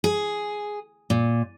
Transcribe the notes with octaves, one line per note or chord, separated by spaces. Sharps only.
G#4
A#2